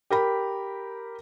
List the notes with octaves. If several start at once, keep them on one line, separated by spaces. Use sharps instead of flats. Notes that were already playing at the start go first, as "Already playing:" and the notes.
G4 A#4 B5